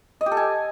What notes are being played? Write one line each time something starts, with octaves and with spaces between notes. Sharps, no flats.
D#5
G4
A4
G#5